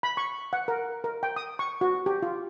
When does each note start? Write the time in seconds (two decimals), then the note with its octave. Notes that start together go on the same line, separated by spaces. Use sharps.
0.03 B5
0.17 C#6
0.53 F#5
0.68 A#4
1.04 A#4
1.23 G5
1.36 D#6
1.59 C#6
1.81 F#4
2.06 G4
2.23 F4